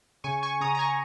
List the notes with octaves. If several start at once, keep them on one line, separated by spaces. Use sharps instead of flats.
C#3 G#5 C#6
G#5 C#6
C#3 A#5 D#6
A#5
G#5 C#6